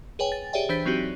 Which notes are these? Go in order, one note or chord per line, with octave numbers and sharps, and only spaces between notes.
G#4 B4 C#5 G5 G#5
A6
G4 G#4 C#5 D5 E5 G5
E3 D4 C5 G6 B6
F#3 C4 D#4 F#4 G4